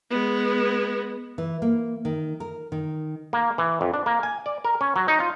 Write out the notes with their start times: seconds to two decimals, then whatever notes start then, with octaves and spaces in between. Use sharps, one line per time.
0.10 G#3 B3
1.38 E3
1.62 A#3
2.05 D#3
2.40 A#4
2.72 D#3
3.33 A#3
3.58 E3
3.81 F2
3.94 D4
4.06 A#3
4.23 G#5
4.46 D5
4.65 A#4
4.81 C#4
4.96 F#3
5.08 D#4
5.20 F4